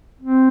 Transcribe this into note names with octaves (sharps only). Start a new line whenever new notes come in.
C4